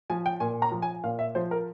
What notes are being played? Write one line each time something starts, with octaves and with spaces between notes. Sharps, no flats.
F3 G#5
G5
A#2 G#5
A#5
F3
G#5
A#2 F5
E5
F3 C5
A#4